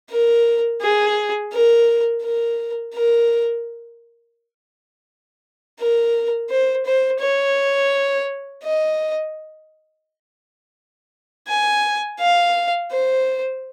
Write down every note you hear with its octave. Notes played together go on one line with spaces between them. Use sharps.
A#4
G#4
A#4
A#4
A#4
A#4
C5
C5
C#5
D#5
G#5
F5
C5